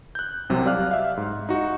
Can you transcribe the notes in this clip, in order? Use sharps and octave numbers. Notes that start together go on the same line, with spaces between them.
F#6 G6
C2 C3 F#3
G4 D5 F5 F6 F#6
E5 F5
G#2
D#4 F#4